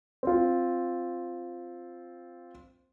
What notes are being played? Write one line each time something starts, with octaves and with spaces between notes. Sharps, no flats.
C4 F4